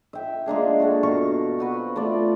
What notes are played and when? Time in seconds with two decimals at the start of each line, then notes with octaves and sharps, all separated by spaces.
0.13 E5 G5
0.46 G#3 A#3 D4 G#4
0.80 F#4 A4 A#4
1.03 B2 F5 A#5 C#6
1.58 C4 F#4 B4
1.96 A3 F4 D5